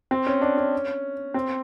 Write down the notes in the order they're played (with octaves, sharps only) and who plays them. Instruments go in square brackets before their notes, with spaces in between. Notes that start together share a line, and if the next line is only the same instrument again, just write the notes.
[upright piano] C4
C#4
D4
C#4
C4